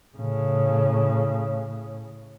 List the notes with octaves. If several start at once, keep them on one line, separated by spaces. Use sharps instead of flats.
A2 C#3